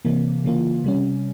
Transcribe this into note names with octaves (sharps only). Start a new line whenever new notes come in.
C3 E3 A#3
C#3 E3 A#3 F4
C3 G3 C#4